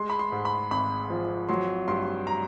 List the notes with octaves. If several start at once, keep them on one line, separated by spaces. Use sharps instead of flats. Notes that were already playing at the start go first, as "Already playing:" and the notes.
Already playing: G#3 C6
B5
C6
G#2
B5
G#1 B5
F3
F#3 C6
G2 C6
A#5